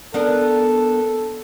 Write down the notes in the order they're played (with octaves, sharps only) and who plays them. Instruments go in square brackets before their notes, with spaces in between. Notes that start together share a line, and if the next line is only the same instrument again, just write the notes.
[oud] B3 D4 A#4 [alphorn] A4